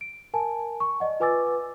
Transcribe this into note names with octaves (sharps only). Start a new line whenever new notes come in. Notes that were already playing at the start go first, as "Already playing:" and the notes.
D7
A#4 G#5 A5
C#6
D5 D#5 F#5
F4 B4 G#5 D6 E6 A6